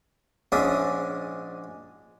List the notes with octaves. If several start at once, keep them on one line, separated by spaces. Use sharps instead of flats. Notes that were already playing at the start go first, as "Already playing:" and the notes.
A#1 G#2 C#4 D4 E5 D#6